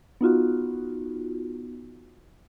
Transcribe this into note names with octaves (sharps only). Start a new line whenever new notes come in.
B3 D#4 F4 F#4